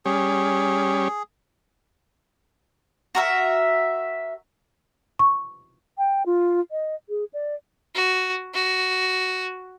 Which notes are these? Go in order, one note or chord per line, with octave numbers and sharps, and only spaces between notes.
G3 C#4 G#4
F#4 A#4 E5
C#6
G5
F4
D#5
G#4
D5
F#4
F#4